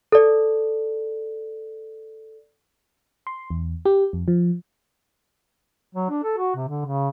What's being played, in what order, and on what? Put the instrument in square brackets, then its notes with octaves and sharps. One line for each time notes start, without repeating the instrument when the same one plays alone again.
[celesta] A4 D5
[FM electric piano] C6
E2
G4
F2
F3
[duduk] F#3
D4
A4
F#4
C3
D3
C#3